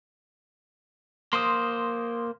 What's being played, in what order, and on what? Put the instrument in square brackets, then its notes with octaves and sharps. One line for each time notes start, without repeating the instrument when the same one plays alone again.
[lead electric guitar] A#3 C5 [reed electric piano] C6 D#6